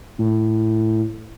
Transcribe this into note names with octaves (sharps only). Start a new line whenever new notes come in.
A2